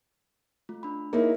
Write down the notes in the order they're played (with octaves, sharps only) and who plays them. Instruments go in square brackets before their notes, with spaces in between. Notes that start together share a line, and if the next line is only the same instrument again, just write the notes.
[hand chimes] A3 F4
D4 B5
[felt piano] A#3 D#4 E4 [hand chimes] G#4 C#5 E5